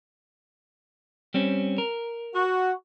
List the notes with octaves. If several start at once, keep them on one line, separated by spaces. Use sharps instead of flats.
G3 C4 C#4
A#4
F#4